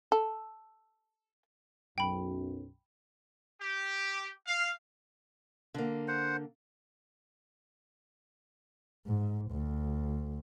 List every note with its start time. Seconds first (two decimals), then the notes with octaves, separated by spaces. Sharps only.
0.12 A4
1.98 B1 F#2 G5 B5
3.61 G4
4.47 F5
5.74 D3 A#3
6.08 C5 F#5
9.07 G#2
9.51 D2